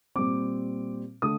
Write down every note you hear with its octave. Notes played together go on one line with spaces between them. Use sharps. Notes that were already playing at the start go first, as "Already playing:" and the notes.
A#2 G3 C4 D6
D3 A3 D#6